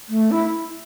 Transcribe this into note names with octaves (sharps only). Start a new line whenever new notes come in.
A3
E4